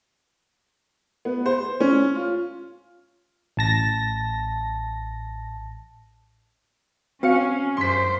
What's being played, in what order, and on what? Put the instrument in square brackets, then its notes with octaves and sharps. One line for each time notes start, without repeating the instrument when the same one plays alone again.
[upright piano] B3
C5
C#4
F4
[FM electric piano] A1 A5 A#6
[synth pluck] C4 F#4 C#7 [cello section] C#4 [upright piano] F5
[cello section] F#2 C5 [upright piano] C6 B6